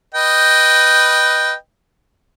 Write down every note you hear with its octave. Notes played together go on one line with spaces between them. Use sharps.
B4 D#5 G5